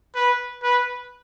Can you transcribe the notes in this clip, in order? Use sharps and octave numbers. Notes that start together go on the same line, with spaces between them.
B4
B4